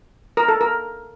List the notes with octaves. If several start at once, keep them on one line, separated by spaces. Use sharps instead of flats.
A#4
A4
A#4